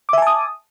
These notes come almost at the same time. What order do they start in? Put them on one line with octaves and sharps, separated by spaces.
D6 E5 G#5 A5 D#6